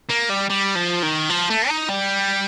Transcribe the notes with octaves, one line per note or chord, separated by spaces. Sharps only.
A#3
G3
G3
F3
D#3
F3
A3
D#4
G3